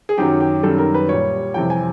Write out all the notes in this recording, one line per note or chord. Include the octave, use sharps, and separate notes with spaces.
G#4
F#2 D#3 F#3 G4
G4
F#2 D#3 G3 A4
A#4
B4
A#2 G3 C#5
F2 C3 E3 G3 G5
G#5